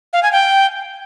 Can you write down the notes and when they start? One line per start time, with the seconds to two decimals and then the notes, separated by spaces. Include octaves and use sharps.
0.13 F5
0.23 G#5
0.32 G5